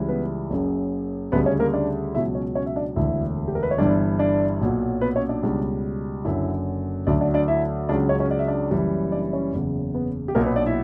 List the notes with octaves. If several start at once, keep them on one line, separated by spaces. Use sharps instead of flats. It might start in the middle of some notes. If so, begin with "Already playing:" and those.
Already playing: C#2 C#3 E3 G3
B3 B4
F#1 F#2 C#3
D2 C#3 G3 B3 B4
C#4 C#5
A#3 A#4
D4 D5
C#2 B2 F#3 E4 E5
C#4 C#5
C#4 C#5
E5
D4 D5
E1 D2 D3 E4 E5
G4
A#4
B4
C#5
G1 G2 E3 D4 D5
D4 D5
B1 A#2 F#3
B3 B4
C#4 C#5
D4 D5
C#2 B2 G3
F#1 F#2 D3 F#3 E4 E5
D2 D3 F#3 D4 D5
D4 D5
D4 D5
E4 E5
C#2 C#3 F#3 D4 D5
C#4 C#5
C#4 C#5
D5
E5
D4 D5
F#1 F#2 E3 G3
D4 D5
C#4 C#5
F#1 E2 C#3
B3 B4
G4
B1 A#2 F#3 A#3 A#4
B3 B4
D4 D5
E4 E5